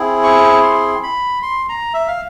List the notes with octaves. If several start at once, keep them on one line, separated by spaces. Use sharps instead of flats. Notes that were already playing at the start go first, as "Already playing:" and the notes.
Already playing: C4 E4 G#4
C#6
C6
B5
C6
A#5
E5
F5